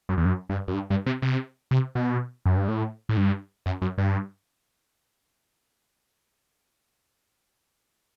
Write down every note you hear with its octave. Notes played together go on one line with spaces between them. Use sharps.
F#2
E2
F#2
G2
F#2
G2
G2
C3
C3
C3
B2
F#2
G2
A2
A2
G2
F#2
F#2
G2